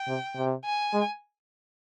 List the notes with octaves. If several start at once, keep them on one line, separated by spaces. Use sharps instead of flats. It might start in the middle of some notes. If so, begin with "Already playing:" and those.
Already playing: G5
C3
C3
G#5
G#3